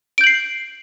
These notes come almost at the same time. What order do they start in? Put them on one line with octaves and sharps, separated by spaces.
D7 G6 F#7 C7